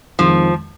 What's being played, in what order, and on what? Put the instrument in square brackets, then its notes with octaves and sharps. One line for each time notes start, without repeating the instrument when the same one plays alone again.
[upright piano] F2 D#3 G#3 [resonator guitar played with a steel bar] F3